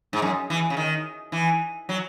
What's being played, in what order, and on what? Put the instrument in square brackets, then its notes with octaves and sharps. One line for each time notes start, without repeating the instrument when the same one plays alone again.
[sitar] G#2
F#2
E3
C#3
D#3
E3
F#3